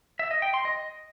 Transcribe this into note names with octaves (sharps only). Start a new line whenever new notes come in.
E5
D#5
G5
C6
D#5